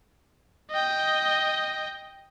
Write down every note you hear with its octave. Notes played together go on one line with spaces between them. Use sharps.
D#5 G5